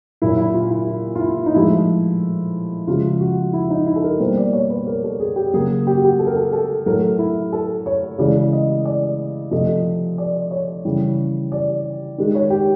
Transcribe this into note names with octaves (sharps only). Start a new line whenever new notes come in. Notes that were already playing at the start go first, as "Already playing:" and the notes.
A#2 F#3 A#3 E4
E4
F4
E4
F4
F4
E4
D#4
A2 F3 G#3 E4
C#3 F3 G#3 F4
F#4
E4
D#4
E4
A4
A#4
B2 G3 A#3 C5
D5
C#5
B4
A#4
A4
G#4
G4
C#3 F#3 A#3 G#4
G4
F#4
G4
A4
A#4
A4
A4
A2 F#3 A3 A#4
E4
A4
C#5
C#3 E3 G#3 D5
D#5
D5
C3 F3 A3 D#5
D5
C#5
C#3 E3 G3
D5
D#3 G#3
C#5
G4